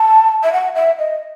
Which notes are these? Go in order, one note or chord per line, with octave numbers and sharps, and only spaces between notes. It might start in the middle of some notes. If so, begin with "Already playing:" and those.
Already playing: A5
E5
F#5
E5
D#5